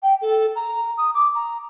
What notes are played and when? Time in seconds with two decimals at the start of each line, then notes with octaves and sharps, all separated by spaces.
0.03 G5
0.22 A4
0.56 A#5
0.98 D#6
1.15 D6
1.35 A#5